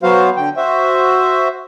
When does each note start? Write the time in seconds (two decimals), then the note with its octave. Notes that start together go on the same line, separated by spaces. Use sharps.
0.03 F#3 B3 F#4 C5 F5
0.37 D3 G5
0.57 F#4 C5 E5